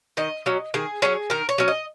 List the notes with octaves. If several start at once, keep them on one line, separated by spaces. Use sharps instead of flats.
D#3 D#5
F#3 C#4
D#3 G#4
F#3 C#4 G#4
D#3 A#4
C#5
F#3 C#4
D#5